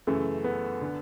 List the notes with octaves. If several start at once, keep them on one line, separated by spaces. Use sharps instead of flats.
F#2 C#3 E3 A3
B3
D3